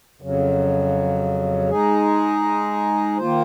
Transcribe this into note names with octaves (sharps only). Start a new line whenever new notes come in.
F2 C#3 F#3
G#3 D#4 G#4
D#3 A#3 F4 C5